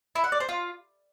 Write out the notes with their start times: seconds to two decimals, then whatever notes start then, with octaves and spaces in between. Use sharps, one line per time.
0.15 E4
0.24 F#5
0.32 D5
0.40 C5
0.49 F4